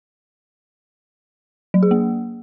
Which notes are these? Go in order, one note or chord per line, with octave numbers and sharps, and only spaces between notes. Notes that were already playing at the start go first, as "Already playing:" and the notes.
F#3
G#4
A#3